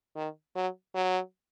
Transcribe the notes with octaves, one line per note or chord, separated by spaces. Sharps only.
D#3
F#3
F#3